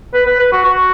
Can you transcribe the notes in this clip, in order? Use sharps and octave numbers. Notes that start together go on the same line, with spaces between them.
B4
B4
B4
F#4
F#4